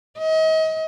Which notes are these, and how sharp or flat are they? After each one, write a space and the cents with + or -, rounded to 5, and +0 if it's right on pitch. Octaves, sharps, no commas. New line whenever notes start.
D#5 +35